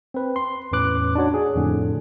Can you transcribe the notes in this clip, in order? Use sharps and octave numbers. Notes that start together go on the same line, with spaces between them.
C4 B4
C6
E2 A2 C#4 B4 D6 F#6
D4 D#4 F#4 C#5
G#4
F2 A2 D3